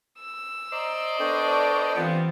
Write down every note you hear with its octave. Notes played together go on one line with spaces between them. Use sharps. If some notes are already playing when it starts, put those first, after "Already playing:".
E6
C5 D5 D#5 A#5
B3 D4 A4 G5 C#6
E3 G3 B3 C4 F4